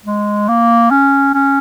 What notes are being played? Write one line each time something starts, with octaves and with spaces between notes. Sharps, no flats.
G#3
A#3
C#4
C#4